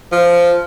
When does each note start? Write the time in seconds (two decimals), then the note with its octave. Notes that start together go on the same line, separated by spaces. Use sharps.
0.12 F3